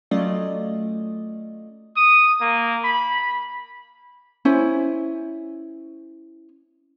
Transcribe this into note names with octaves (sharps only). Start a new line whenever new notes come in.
F#3 A3 C#4 F4 D5 D#5
D#6
A#3
B5
C#4 E4 C5 G#5